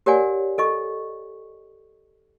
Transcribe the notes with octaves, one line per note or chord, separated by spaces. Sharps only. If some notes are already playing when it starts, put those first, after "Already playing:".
G4 A#4 C#5 D5 F#5 G#5
A4 D#5 C#6